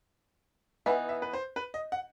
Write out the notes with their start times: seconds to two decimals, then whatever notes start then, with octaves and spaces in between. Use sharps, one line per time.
0.86 E3 B3 D#4 E5
1.09 E5
1.22 B4
1.33 C5
1.56 B4
1.74 D#5
1.92 F#5